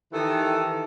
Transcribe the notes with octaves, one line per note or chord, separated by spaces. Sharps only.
D#3 E3 G4 A4